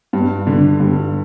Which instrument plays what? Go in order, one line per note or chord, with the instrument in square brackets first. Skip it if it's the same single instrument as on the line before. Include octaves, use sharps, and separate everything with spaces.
[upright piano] G2
D3
G2